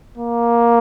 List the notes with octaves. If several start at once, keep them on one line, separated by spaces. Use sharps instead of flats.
A#3